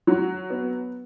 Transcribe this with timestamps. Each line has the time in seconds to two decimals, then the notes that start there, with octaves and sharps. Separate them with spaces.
0.07 F#3
0.50 B3